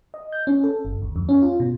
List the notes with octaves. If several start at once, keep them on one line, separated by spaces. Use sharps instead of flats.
D#5
G6
C#4
A4
G1
D2
F2
C#4
F4
B2